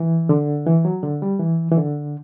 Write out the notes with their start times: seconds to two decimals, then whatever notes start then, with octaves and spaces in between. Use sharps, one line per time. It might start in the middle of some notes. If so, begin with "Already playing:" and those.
Already playing: E3
0.29 D3
0.67 E3
0.85 F#3
1.03 D3
1.22 G3
1.40 E3
1.72 E3
1.77 D3